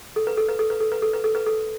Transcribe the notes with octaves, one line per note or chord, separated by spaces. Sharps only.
A4
B4
A4
B4
A4
B4
A4
B4
A4
B4
A4
B4
A4